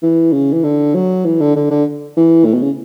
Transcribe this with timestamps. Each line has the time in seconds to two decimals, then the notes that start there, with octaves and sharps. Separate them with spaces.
0.03 E3
0.33 C#3
0.53 E3
0.64 D3
0.95 F#3
1.25 E3
1.41 D3
1.56 D3
1.71 D3
2.17 E3
2.45 A2
2.53 B2
2.62 C#3